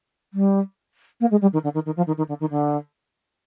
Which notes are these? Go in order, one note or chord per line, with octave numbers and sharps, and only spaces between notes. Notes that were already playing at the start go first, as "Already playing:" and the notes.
G3
A#3
G#3
G3
D#3
D3
D#3
D#3
F3
D#3
D#3
D3
D#3
D3